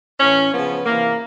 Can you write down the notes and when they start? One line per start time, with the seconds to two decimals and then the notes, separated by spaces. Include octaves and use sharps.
0.20 A2 E3 C#4
0.53 C#3 F3 B3
0.86 C3 E3 A#3